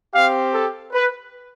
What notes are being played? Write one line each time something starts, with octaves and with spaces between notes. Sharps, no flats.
C4 G4 F5
A4
B4